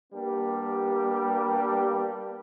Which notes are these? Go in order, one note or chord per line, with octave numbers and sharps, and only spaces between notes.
G3 A#3 B3 D4 G4